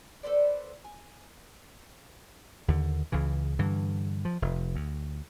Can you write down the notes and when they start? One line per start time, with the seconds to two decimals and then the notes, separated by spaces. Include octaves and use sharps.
0.23 A4 B4 C5 D5
0.84 G#5
2.68 D#2 D3
3.12 C#2 C#3 E3
3.59 G2 D3 E3
4.25 F3
4.42 F1
4.76 D2